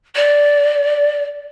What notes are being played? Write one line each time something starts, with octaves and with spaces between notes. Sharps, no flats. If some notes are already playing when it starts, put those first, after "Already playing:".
D5